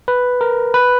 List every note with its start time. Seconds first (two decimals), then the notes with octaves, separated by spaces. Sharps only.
0.08 B4
0.41 A#4
0.74 B4